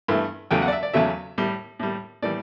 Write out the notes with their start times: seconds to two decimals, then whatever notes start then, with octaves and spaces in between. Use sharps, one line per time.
0.08 G2 E3 A3
0.51 E2 C#3 F#3 A3 G5
0.62 F#5
0.68 D5
0.72 E5
0.83 D5
0.93 E2 C#3 F#3 A3 E5
1.38 A2 G3
1.79 A2 G3
2.22 A2 E3 G3 D5